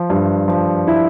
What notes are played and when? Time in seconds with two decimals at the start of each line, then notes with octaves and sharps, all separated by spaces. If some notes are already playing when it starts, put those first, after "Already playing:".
Already playing: F3
0.10 G2
0.48 F3
0.88 E4